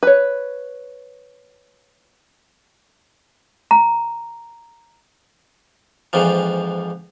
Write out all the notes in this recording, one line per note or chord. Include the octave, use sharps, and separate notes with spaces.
B4 C#5
A#5
F2 G#2 E3 F3